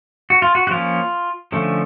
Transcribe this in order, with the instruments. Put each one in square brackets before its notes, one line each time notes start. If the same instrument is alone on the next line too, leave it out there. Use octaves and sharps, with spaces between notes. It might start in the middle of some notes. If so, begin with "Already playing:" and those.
[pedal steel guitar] F#4
F4
F#4
F#4
F3 A#3 C#4 F4
D3 F3 A3 C#4